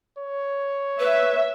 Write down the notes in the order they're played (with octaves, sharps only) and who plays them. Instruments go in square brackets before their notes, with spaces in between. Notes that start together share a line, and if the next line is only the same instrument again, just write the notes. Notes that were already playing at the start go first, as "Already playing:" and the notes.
[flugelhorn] C#5
[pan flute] B4 [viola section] E5